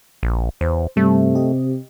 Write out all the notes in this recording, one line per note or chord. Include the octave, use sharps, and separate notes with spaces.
A#1
E2 C5
G2 C3 G3 A3
G4 D#5